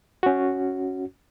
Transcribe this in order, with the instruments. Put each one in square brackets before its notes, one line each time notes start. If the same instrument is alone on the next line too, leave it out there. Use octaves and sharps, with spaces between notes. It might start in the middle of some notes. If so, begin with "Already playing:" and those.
[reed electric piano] C#4 F#4